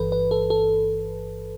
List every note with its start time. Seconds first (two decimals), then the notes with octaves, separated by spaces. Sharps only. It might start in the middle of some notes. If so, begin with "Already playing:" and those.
Already playing: G1 G2 E3 A4 B4
0.12 B4
0.31 A4
0.50 A4